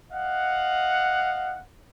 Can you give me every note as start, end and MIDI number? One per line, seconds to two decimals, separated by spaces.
0.12 1.60 75
0.12 1.60 77
0.12 1.60 78